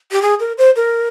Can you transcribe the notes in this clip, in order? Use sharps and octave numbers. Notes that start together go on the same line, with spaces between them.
G4
G#4
A#4
C5
A#4